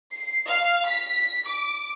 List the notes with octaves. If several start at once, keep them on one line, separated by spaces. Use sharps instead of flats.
C7
F5
B6
D6